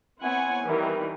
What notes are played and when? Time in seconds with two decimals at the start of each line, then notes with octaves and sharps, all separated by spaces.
0.21 B3 C4 E4 C#5 F#5 G#5
0.62 D#3 E3 G3